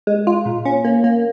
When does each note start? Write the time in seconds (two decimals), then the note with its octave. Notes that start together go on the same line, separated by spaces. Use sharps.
0.07 G#3
0.27 F4
0.46 A#2
0.65 C#4
0.85 A#3
1.04 A#3